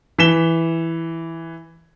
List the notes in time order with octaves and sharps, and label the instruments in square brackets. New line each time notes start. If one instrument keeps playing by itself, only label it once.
[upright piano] E3 B6 E7 G7